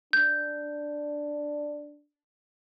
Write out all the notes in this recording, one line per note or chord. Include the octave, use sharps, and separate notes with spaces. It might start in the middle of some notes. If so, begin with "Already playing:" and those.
D4 G6